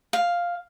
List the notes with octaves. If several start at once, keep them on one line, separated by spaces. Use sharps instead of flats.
F5